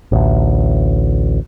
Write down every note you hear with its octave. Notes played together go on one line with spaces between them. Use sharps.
A1 D2